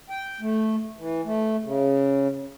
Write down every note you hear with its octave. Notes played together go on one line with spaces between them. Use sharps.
G5
A3
E3
A3
C#3